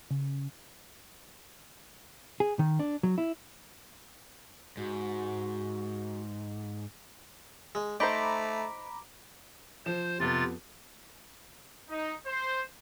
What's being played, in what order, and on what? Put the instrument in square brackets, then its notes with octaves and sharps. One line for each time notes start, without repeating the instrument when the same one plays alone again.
[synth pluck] C#3
[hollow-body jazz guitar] G#4
D#3
D4
F#3
E4
[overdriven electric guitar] G#2 [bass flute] F#4
[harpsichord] G#3
[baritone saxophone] A3 [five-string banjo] D#4 C5 [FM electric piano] A#5 B5 D6 [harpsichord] C#6
[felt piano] F3 E7 [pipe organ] C5
[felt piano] F2 F3 B3 [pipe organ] C3 F4 A6
[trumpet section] D#4
C5